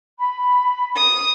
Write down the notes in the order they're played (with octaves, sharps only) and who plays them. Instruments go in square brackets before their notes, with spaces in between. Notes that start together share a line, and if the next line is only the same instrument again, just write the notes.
[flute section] B5
[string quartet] D#6